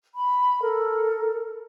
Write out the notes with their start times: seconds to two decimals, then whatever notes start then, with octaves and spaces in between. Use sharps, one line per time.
0.15 B5
0.62 A4 A#4